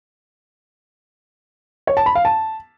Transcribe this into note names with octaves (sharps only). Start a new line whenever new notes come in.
C#5
A5
B5
F5
A5